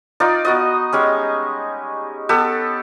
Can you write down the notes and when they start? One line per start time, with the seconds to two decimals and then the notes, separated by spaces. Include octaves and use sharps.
0.20 D#4 F4 D5
0.45 B3 F#4 D#5
0.93 G3 G#3 C#4
2.29 B3 G4 A4